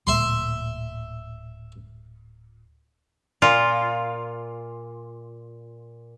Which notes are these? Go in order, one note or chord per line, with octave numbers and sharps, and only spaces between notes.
D1 A#2 E5 C6
A#2 F4